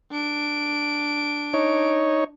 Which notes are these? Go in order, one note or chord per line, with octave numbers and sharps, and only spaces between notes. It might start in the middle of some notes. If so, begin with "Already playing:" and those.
D4 D7
D#4 C#5